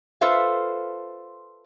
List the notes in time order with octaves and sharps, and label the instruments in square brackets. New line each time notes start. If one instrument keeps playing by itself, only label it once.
[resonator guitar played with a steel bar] F4 A4 B4 C5 E5 F5